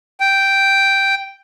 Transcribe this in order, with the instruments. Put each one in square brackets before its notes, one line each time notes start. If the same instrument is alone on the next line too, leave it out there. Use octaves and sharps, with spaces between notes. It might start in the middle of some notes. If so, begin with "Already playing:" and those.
[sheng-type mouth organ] G5